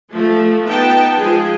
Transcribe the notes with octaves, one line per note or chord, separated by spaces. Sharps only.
F3 A3
B3 D#4 G5 A5
F3 G#3 F4 G#4